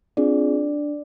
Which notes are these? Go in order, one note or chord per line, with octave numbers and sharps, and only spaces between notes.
C4 D4 F4 G#4 D5